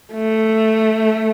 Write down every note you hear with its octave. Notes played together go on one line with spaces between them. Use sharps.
A3